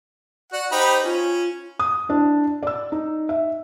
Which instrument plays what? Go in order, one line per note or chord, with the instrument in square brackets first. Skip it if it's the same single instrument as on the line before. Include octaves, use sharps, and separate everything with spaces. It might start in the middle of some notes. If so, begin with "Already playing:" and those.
[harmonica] F#4 F#5 [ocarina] D5
[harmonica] D#4 G4 B5 [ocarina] C5
[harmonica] C#4 [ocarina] F4
[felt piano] D#6
D4 E4
D5 E6
D#4
E5